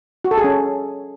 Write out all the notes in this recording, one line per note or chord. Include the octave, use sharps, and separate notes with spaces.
F#4
A4
G#4
C#4